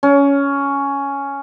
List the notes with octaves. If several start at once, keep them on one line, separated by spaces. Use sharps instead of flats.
C#4